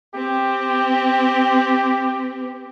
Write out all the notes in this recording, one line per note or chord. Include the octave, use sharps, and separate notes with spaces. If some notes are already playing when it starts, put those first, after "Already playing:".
C4 G4